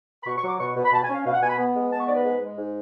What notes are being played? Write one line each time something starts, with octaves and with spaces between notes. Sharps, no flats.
B5
B2 C#6
C#6
F#3
D6
B2 C#6
B2
B5
B2 A5
G#5
C#4 F5
B2 F5
F#5
B2 G#5
B5
B3
G#3
B3 A5
C#6
G#2 D5
B4
G#3
G#3
G#2